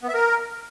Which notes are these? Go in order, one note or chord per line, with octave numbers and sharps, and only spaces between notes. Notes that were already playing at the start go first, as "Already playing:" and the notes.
B3
E5
A#4